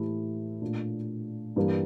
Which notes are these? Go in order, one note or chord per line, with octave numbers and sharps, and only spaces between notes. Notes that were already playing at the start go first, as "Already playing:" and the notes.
Already playing: A2 E3 A3 E4 G4
A#2 A3 D4
G2 E3 G3 A#3